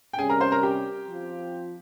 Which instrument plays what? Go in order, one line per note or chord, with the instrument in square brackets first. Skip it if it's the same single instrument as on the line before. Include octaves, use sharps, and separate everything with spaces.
[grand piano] G5
[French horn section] C3 G3 C#4 [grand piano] G#4 G#5
[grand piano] A#4 A#5
C5 C6
A#4 A#5
G4 G5
[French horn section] F3 C4 F4